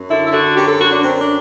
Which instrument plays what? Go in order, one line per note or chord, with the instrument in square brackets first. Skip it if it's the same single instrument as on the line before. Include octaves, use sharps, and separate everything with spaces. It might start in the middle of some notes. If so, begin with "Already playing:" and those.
Already playing: [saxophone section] F#2
D3 E4
E4
D3 F#4
F#2 G4
A4
D3 F#4
D4
F#2 C4
D4